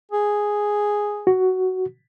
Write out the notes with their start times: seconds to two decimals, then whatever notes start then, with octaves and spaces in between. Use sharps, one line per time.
0.11 G#4
1.27 F#4